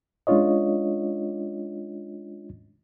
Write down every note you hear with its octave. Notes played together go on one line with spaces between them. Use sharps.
G#3 C#4 D4 F4 C#5 D#5